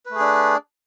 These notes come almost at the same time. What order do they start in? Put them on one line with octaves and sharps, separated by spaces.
B4 A3 G#4 D4